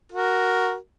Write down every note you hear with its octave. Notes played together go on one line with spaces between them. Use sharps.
F#4 A#4